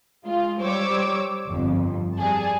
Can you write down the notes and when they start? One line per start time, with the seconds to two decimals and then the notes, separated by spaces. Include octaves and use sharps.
0.25 G#3 F4
0.61 G3 C5 C#5 D6 E6
1.47 G1 F2
2.17 G3 G#4 A5